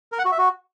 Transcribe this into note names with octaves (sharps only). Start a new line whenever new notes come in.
A#4
F#5
F#4
E5
F#4